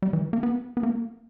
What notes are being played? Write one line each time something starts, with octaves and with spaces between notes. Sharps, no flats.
G3
E3
A#3
B3
B3
A#3